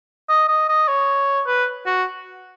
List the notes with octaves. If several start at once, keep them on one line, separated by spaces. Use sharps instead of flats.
D#5
D#5
D#5
C#5
B4
F#4